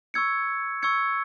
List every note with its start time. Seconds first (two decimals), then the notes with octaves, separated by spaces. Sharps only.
0.14 C#6 E6 G#6 C#7
0.83 C#6 E6 G#6 C#7